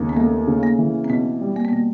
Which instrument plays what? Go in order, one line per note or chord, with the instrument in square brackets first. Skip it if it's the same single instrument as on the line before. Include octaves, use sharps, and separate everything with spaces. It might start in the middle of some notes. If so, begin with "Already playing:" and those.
Already playing: [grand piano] D#2 C#3
[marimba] B3
[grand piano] A3 [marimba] A#3
[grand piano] C#3
[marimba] A#3
[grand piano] E3
[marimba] C4
[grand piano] B2 [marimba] B3
[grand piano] G3
[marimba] A#3
B3
[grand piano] B2 [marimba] A#3